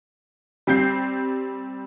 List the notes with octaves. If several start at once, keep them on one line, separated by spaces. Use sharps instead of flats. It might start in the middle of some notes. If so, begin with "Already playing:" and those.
G3 C4 G6 C7